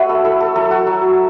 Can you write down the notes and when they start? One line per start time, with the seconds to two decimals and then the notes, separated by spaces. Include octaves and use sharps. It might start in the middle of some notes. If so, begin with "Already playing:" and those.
Already playing: A3 F#4 B4 C#5 E5 F#5
0.09 A4
0.25 E4 A4
0.41 A4
0.56 F#3 A4
0.71 F#4
0.87 F#3